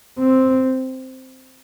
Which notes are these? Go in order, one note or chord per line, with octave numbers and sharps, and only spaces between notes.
C4